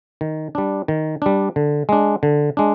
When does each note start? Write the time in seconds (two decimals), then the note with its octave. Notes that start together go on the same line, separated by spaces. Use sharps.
0.21 D#3
0.55 G3 D4
0.88 D#3
1.22 G3 D4
1.56 D3
1.89 G#3 D4
2.23 D3
2.57 G#3 D4